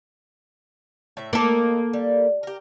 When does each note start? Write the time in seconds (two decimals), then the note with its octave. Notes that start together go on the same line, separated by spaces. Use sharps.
1.17 A2 E5
1.33 A#3 C4 D#4 A4
1.93 G3
2.43 G4 A#4